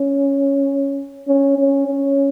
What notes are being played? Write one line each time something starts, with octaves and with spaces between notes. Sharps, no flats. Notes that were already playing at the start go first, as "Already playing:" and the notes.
Already playing: C#4
C#4
C#4
C#4